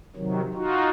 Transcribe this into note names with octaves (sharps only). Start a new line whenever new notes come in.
C3 D#3 F#3
D#4 F4 F#4